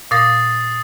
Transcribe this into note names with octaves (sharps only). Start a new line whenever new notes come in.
A#2 F5 D#6 A6 A#6 C7